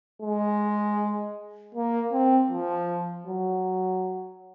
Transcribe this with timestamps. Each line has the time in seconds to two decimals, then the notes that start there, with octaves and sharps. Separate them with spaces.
0.22 G#3
1.75 A#3
2.12 C4
2.51 F3
3.27 F#3